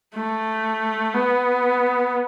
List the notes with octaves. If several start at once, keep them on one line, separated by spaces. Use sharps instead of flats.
A3
B3